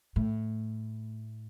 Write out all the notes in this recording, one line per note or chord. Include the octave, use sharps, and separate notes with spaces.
A2